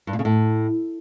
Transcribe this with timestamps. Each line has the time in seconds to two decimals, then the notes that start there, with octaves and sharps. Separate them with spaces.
0.07 G2
0.13 A#2
0.19 C#3
0.25 A2